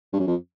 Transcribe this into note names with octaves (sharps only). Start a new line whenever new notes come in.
G2
F#2
F2